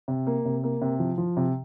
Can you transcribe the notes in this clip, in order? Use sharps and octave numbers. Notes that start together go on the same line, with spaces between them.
C3
A#3
C3
A#3
C3
F3
F3
C3